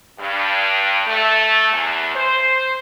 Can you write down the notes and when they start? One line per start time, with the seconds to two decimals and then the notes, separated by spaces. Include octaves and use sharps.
0.19 G2
1.07 A3
1.72 E2
2.16 C5